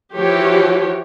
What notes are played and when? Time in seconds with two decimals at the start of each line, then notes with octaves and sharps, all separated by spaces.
0.15 E3 F3 F#4 G4 C#5